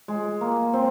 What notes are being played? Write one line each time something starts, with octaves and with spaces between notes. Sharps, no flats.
G#3
A#3
C4